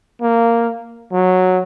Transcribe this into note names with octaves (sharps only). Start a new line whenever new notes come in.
A#3
F#3